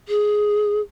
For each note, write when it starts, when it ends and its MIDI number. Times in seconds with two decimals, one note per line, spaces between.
0.08 0.81 68